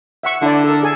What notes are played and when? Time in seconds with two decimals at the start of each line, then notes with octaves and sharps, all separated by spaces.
0.23 E5 F#5 C#6
0.42 D3 E4 D5
0.64 A4 A#4
0.83 G#4 A4 G#5